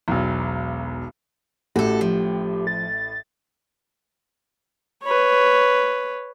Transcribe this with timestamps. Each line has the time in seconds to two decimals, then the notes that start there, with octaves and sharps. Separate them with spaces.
0.08 E1 B1
1.76 A1 A2 F#4 G4 A4
2.01 F3
2.67 A6
5.04 B4 C#5